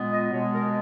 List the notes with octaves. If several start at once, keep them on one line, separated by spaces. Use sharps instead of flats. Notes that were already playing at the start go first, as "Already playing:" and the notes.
Already playing: A#2 G#3 B3
D#5
B2 G#3 B3 C#5
A#4